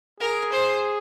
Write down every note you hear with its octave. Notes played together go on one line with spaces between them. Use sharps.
G#4 A#4
C5